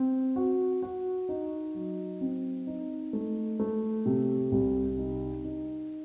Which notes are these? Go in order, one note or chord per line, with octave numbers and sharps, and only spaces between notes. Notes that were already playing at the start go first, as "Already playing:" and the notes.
Already playing: C4
F#4
F#4
D#4
F#3
C4
D#4
A3
A3
C3
C2
D#4
D#4